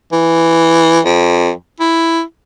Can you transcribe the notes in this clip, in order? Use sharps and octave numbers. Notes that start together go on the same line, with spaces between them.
E3
F2
E4